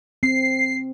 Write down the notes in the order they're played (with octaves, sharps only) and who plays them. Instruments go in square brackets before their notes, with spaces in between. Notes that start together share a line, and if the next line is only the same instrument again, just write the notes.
[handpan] C4 [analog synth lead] C7